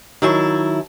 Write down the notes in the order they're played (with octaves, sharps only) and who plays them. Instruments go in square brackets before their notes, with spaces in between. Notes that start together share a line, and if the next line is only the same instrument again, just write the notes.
[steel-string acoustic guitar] D#3 F#3 E4 E5 A5